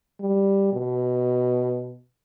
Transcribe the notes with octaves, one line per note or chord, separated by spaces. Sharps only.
G3
B2